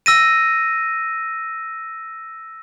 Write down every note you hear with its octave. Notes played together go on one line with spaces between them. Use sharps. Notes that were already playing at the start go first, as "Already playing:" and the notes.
E6 A#6 D#7